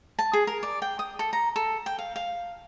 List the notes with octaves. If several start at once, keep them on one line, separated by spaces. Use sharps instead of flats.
A5
G#4
A#4
D5
G5
D#6
A4
A#5
A4
G5
F5
F5